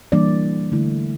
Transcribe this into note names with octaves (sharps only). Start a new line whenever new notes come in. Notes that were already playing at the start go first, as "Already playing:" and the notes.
E3 G3 A#3 D4 D5
D3 A3 E4